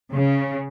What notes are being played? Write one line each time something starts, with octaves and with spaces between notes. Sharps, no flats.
C#3